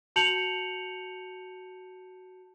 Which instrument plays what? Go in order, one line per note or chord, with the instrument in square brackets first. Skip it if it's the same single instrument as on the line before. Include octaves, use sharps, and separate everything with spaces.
[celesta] F#4 A5 G6 C#7 F7 F#7